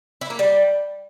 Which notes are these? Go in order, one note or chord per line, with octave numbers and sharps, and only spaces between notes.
E4
A#3
G3